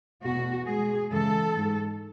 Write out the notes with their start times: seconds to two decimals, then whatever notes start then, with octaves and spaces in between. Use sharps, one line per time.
0.23 E2 B2 A3 F#4
0.66 B2 G#3 G#4
1.10 F#2 C#3 E3 G#3 A4
1.55 G#2 G#3